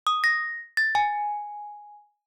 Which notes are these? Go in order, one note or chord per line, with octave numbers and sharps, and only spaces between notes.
D#6
A#6
A6
G#5